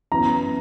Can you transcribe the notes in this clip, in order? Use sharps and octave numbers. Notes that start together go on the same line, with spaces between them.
F#2 E3 B3 A#5